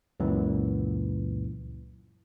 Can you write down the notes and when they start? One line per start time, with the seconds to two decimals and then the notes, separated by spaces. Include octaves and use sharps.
0.20 C#2 F#2 A#2 E3